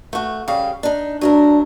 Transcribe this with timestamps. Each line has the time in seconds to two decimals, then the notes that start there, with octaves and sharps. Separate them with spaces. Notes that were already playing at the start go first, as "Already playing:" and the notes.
0.13 A3 F#4
0.48 C#3 G3 F5
0.83 D4 D#4
1.21 F#3 A3 D4 A#4